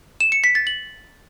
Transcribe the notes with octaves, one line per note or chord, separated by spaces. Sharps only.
E7
C#7
B6
A6
F#7